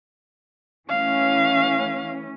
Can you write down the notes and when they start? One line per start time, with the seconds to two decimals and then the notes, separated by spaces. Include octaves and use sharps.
0.89 E3 A3 C#4 F5